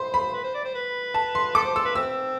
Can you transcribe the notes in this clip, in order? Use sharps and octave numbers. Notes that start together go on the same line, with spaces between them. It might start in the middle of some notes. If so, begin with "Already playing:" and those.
Already playing: C5 B5 C6
B5
B4
C5
D5
C5
B4
A5
C6
A4 D6
C5
A4 E6
B4
C4 E6